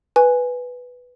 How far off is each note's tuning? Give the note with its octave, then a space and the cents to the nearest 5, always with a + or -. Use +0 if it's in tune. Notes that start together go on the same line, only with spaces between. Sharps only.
B4 +0 G#5 +0